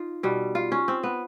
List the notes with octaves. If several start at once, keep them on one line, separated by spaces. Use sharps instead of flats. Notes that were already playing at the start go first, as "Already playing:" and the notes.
Already playing: D#4 F4
B2 G3
F4
C#4
C4
B3